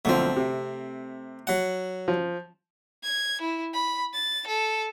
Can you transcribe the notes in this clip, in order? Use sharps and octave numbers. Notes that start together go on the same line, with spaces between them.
B1 D3 F3 A3 C4
C3
F#3 F#5
F3
G#6
E4
B5
A6
A4